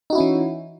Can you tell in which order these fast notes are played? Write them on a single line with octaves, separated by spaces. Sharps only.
D#4 F#4 E4 C#4 E3